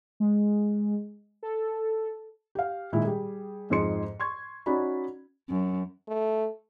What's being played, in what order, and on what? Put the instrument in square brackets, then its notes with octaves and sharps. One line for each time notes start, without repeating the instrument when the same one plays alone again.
[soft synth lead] G#3
A4
[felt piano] G4 F5
A#2 D#3 G#3 E4
G3 G#4
F2 G#2 F3 G#4 C6 C#7
C6 C#6 G#6
C#4 D#4 F#4 D5 B5
[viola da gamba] F#2
[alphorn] A3